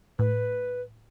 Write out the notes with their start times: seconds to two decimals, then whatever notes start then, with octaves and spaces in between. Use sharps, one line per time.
0.19 A2 B4